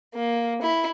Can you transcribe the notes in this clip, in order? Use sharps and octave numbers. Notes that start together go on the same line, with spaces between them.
A#3
E4